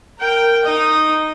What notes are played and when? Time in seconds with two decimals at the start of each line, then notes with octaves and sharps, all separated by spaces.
0.19 A#4 G5
0.65 D#4 D#5